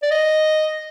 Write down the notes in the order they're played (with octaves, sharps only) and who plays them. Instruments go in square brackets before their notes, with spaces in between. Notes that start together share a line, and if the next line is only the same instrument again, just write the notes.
[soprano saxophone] D5
D#5